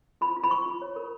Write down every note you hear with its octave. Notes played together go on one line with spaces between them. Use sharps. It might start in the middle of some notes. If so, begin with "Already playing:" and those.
F4 B5
F4
B5
F4 C#6
F4
C#5
A#4